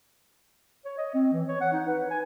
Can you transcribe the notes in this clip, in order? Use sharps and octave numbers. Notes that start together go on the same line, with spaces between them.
C#5
D#5
C4
E3
C#5
F#5
D#4
B4
G#5